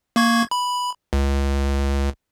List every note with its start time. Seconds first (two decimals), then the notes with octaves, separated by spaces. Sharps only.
0.16 A#3 C#6 G#6
0.51 B5
1.13 C#2